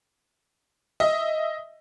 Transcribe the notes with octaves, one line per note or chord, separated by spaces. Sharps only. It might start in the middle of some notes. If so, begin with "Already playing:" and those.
D#5 E5